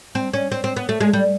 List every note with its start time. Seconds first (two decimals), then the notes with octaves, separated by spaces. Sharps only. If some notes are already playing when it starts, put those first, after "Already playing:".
0.15 C4
0.34 C#4
0.52 C4
0.64 C4
0.76 B3
0.89 A3
1.00 G#3
1.13 G3